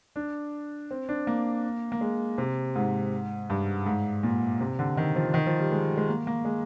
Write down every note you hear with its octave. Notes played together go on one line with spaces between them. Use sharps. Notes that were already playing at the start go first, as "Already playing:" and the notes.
D4
C4
D4
A#3
A#3
G#3
C3
G#2
G2
G#2
A#2
C3
D3
D#3
F3
D#3
F3
G3
G#3
G#3
A#3
A#3
G#3